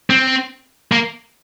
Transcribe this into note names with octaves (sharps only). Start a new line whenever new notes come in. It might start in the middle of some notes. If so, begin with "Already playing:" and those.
C4
A#3